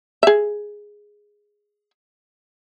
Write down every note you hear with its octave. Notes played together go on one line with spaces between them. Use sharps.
G#4 E5